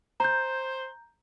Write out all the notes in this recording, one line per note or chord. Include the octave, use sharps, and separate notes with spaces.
C5 A#5 G6